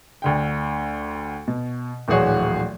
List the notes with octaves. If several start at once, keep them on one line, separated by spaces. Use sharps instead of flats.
D2 D3 G5
B2
D1 A#1 E3 F#4 G#4 C#5